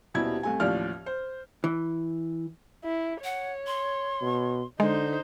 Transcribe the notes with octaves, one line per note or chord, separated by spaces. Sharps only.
D#1 B2 G3 E4 G#6
C2 A3 G#5
A1 D#2 A2 F3 D5 F6
C5
E3
E4
C#5 F#5
C6
B2
D3 G#3 D#4 C5